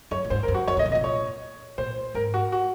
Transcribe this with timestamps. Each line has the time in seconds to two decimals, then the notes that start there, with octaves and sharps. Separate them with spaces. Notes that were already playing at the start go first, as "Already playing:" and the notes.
0.11 F#2 C#5
0.25 A#2
0.30 G#2 C5
0.43 A#4
0.48 F#2
0.55 F#4
0.67 F2 C#5
0.77 A#2 D#5
0.86 C3
0.92 D#5
0.95 A#2
1.04 C#5
1.78 A#2 C5
2.14 G#2 A#4
2.34 F#4
2.52 F#4